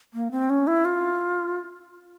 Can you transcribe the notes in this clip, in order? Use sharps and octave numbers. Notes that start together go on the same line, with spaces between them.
A#3
C4
C#4
E4
F4